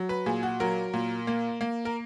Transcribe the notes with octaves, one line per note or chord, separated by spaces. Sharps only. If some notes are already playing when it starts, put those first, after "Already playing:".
Already playing: F#3
B4
A#2 G#4
F#4
F#3 A#4
A#2
A#3
A#3
A#4